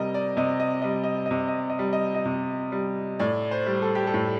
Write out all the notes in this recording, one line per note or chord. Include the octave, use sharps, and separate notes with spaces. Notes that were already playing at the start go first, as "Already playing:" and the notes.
Already playing: C3 G3 A#4 D#5
D5
C3 D#5
D#5
G3 D#5
D#5
C3 D#5
D#5
D#5
G3
D#5
D#5
C3
G3
A2 D5
C5
G3
A4
G4
A4
A2